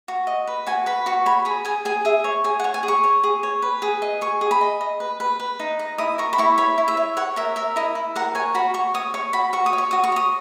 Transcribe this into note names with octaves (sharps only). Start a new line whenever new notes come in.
F#4
D#5
B4
F#4 G#5
B4 B5
F#4 C#6
C#5 B5
G#4 B5
G#4 G#5
G#4 G#5
G#4 E5
C#5
G#4 G#5
F#5
C#5
G#5
G#4
C#6
C#5
G#4
C#5
B4
G#4
D#5
G#4 C#6
G#4
B5
D#5
D#5
B4
B4
B4
D#4
D#5
E4 D#6
A#4 C#6
B5
E4 C#6
C#5 B5
E4
E5
C#5
C#5 F#5
A#4 E5
A#4 E5
E4 D#5
E4
A#4 F#5
C#5 G#5
F#4 B5
F#4 C#6
C#5 D#6
C#5 C#6
F#4 B5
F#4 C#6
D#6
C#5
C#6
F#4 D#6
C#6
C#5 D#6